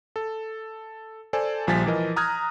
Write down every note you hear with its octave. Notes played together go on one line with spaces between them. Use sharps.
A4
A4 C5 D5 G#5 A5
A#1 F3 G3 G#5 A6 B6
E3 F3 A#4 D#5
A#5 D#6 F6 F#6 G#6